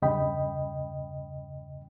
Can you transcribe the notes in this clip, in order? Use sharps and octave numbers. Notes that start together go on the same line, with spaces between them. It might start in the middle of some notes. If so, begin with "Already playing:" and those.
E2 G2 C#3 D#5 G5 B5